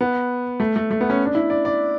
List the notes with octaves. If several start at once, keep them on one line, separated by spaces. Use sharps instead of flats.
B3
A3
A3
A3
B3
C#4
D4
E4
D5
D5